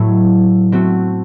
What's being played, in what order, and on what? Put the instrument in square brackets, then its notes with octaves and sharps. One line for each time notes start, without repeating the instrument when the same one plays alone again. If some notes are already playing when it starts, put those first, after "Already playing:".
Already playing: [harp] A2 F#3 A3
A3 C4 F#4